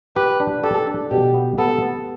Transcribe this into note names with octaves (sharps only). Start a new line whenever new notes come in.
G4 B4
D4
G4 A4
D4
B2 G4
B3
B3 A4
B3